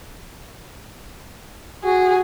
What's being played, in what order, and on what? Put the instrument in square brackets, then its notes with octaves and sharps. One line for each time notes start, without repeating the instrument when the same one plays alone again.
[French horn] F#4 [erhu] G#4